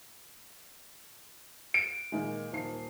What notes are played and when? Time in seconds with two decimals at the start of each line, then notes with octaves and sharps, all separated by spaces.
1.74 D7
2.12 A#2 D#3 G#3
2.52 D#1 D#3 C7